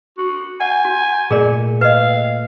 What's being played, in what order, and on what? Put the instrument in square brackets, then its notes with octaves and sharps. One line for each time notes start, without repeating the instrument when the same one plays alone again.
[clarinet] F#4
[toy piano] F#5 [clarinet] G#5
[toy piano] F#4
[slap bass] A#2 A3 [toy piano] G#4 A#4 D5
[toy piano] B4 D#5 [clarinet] F5